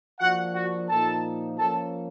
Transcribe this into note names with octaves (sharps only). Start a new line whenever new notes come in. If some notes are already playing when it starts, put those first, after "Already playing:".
F3 A#3 D4 F#4 F#5
F#4 F#5
A#2 F3 A#3 D#4 A4 A5
F3 A#3 C#4 A4 A5